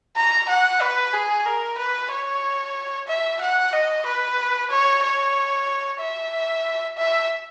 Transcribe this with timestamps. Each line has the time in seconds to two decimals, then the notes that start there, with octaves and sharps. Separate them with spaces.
0.16 A#5
0.49 F#5
0.81 B4
1.13 G#4
1.45 A#4
1.78 B4
2.11 C#5
3.07 E5
3.41 F#5
3.73 D#5
4.05 B4
4.70 C#5
5.03 C#5
5.99 E5
6.97 E5